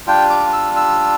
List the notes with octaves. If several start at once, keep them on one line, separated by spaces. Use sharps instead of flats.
G3 D4 F4 G5
D6
E6
E6